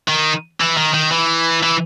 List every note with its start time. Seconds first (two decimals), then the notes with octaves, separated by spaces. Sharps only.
0.09 D#3
0.60 E3
0.77 D#3
0.94 D#3
1.12 E3
1.63 E3